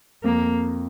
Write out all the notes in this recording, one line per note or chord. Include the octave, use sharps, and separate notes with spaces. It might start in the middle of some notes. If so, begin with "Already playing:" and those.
F2 A#3